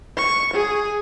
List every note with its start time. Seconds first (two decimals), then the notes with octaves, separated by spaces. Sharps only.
0.17 C#6
0.53 G#4